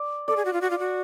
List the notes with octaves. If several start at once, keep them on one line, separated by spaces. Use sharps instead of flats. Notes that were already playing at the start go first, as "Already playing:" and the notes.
Already playing: D5
A4 D5
G#4
F#4
F4
F#4
F4
F#4